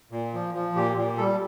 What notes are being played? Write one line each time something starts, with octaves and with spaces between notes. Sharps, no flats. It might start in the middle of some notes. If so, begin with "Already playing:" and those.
A#2
F3
F3
A#2 G4
A#2
G3 A4